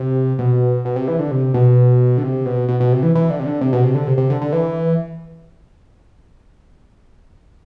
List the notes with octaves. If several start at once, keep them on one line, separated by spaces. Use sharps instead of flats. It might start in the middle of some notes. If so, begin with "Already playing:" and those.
Already playing: C3
B2
B2
C3
E3
D3
C3
B2
D3
C3
B2
B2
B2
C3
E3
E3
D3
C3
D3
C3
B2
C3
D3
C3
C3
D3
D3
E3